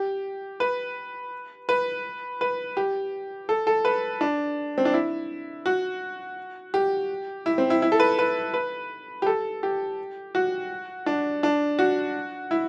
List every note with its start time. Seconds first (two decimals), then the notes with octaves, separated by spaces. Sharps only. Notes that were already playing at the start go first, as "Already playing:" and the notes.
Already playing: G4
0.60 B4
1.69 B4
2.41 B4
2.77 G4
3.49 A4
3.67 A4
3.85 B4
4.21 D4
4.78 C4
4.85 D4
4.94 E4
5.66 F#4
6.74 G4
7.46 E4
7.58 C4
7.70 E4
7.82 E4
7.92 A4
8.00 B4
8.19 B4
8.54 B4
9.22 G4
9.26 A4
9.63 G4
10.35 F#4
11.06 D4
11.43 D4
11.79 F#4
12.51 E4